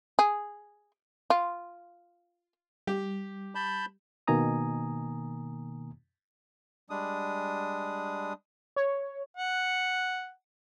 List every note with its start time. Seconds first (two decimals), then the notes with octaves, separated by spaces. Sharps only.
0.19 G#4
1.30 F4
2.87 G3 G4
3.55 A5 B5 G6
4.27 B2 D#3 A#3 G#5 A#5 D#6
6.90 G3 G#3 D4 D#6
8.76 C#5
9.37 F#5